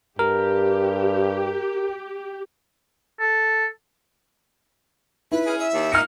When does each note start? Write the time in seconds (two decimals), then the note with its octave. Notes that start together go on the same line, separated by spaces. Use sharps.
0.19 G2 G4 A#4
3.20 A4
5.32 E4 B4
5.47 C#4 G#4
5.59 E5
5.73 D#2
5.92 A#3 D#4 F6 C#7